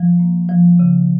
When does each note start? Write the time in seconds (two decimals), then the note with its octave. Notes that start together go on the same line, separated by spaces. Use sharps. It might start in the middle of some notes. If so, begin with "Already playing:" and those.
Already playing: F3
0.19 A#3
0.49 F3
0.79 C#3